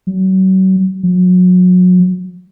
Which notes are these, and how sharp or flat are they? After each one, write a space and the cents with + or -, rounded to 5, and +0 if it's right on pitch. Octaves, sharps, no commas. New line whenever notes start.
F#3 +35
F#3 -30